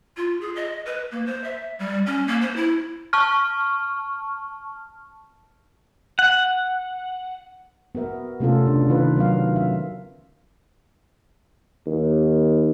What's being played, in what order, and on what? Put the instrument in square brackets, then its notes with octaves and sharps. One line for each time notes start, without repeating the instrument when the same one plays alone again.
[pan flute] F4
G#4
D#5
B4
A#3
C5
E5
G3
C#4
A#3
C5
E4
[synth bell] A5 C#6 F6
[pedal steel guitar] F#5
[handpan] B3 F#4 A#4 E5
C3 A3 B3 C#4 F4 A4
C#3 D4
D#3 D#4 F4 B4
F#3 B3 A#4 F5
C#4 E5 F5
[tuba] D#2